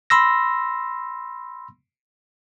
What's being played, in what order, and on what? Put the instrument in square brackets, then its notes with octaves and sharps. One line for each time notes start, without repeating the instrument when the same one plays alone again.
[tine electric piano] B5 C6 E6 A#6